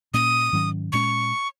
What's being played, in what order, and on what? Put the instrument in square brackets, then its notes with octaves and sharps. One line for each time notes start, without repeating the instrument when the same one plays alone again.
[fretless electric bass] A#2 A#3 C#4 [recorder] D#6
[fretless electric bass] G#2 D#3 F#3 C#4
[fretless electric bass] A#2 G#3 C#4 [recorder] C#6